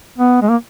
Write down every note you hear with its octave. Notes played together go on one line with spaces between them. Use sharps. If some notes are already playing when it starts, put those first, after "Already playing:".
B3
G#3
A#3